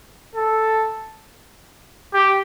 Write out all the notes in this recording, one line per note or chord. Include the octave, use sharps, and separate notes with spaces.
A4
G4